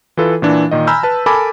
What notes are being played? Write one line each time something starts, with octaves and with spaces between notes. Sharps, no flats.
E3 F4 A4 B4
A#2 E3 D4
A#2 D#3 D#5
G#5 A#5 B5 E6 F6 G6
B4 A5 F6
A4 A#4 G#5 A5 B5 D6